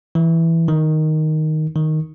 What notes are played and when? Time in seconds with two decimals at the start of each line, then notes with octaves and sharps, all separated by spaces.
0.15 E3
0.68 D#3
1.75 D#3